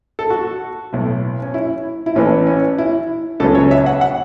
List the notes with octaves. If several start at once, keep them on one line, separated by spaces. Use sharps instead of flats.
A4
F#4
B1 A2 A3
C#4
E4
E4
A1 A2 E3 B3 C#4
C#4
E4
C#2 C#3 F#3 B3 A4
C#5
E5
F#5
F#5